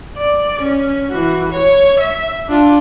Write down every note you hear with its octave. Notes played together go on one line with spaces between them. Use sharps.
D5
C#4
E3 F#4
C#5
E5
D4 F4